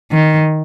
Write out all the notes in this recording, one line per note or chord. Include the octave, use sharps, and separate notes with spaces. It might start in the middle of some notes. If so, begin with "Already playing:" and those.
D#3